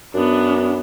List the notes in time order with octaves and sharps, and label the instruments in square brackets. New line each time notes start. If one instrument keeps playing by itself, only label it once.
[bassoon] F#2 [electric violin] B3 D4